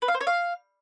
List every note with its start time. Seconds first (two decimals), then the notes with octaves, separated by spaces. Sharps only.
0.02 B4
0.08 F5
0.14 C5
0.21 C#5
0.27 F5